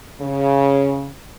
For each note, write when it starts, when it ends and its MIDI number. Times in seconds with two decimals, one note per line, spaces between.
0.21 1.10 49